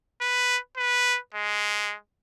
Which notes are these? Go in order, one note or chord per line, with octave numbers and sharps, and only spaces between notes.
B4
B4
G#3